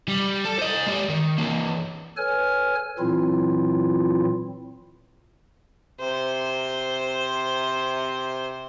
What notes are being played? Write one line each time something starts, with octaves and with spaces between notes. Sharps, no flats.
G3
A4
C5 D#5
G#3 G4
D#3
E3 A#3
A4 B4 C#5 G#5 F6
A#2 E3 F#3 C4 E4 F4
C3 C5